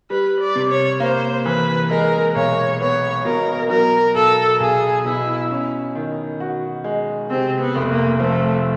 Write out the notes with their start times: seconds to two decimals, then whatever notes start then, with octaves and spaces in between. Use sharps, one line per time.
0.10 G3 B4
0.40 D5
0.55 C3
0.70 C#5
1.00 A#3 C5
1.45 E3 B4
1.90 G#3 A#4
2.35 B1 C#5
2.80 B3 C#5
3.25 B2 A#4
3.70 F#3 A#4
4.15 B1 A4
4.59 B1 G#4
5.04 B2 E4
5.51 C#4
5.95 D#3
6.40 F#4
6.84 G#3
7.30 C3 C4
7.60 B3
7.75 F1
7.90 A#3
8.20 F3 A3